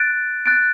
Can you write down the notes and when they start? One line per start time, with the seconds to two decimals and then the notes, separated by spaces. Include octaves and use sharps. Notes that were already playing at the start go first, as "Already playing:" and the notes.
Already playing: F#6 A6 D7
0.46 F#6 A6 D7